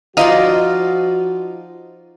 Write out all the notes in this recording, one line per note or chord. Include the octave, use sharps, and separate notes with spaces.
F3 D#4 F4 F#4 D5 D#5 F5